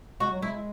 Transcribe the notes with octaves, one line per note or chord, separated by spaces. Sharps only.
G#3 F#4
F#3
G#3 E4